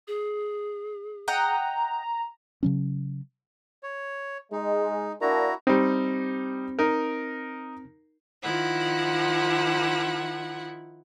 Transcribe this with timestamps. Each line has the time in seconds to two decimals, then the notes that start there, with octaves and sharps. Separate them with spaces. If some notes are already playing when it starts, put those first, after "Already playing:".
0.08 G#4
1.28 D#5 F#5 G5 A#5
2.63 C#3 F#3 C#4
3.83 C#5
4.52 G#3 D#4
5.21 A#3 D4 E4 F#4 A#5
5.67 G3 C4 D#4
6.79 D#4 A#4
8.41 D#3 F3 E4 F#5